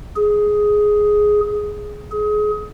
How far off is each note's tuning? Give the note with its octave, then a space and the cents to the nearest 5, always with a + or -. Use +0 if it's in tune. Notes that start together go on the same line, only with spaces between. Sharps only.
G#4 +5
G#4 +25